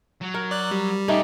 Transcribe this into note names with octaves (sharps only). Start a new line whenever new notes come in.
F#3
A#4
D5 F#6
G3
A3 C#4 D#4 G4